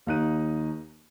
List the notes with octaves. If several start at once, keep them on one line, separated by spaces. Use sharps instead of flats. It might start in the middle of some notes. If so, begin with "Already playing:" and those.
D#2 A#3 D#4 F#6 D#7